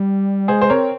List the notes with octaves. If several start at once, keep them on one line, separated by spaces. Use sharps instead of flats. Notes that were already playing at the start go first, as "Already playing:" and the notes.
Already playing: G3
G#3 G#4 C5
C5
C4 A#4 C#5